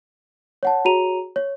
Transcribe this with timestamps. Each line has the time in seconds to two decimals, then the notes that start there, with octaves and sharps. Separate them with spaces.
0.63 C#5 F#5 A5
0.85 F#4 G#4 C#5 A#5 D#7 F7
1.36 C#5